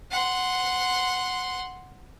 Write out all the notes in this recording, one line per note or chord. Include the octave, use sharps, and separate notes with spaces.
F#5 C6